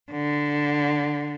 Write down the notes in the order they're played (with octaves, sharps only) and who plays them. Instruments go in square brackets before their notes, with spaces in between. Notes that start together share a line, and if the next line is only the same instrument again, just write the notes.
[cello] D3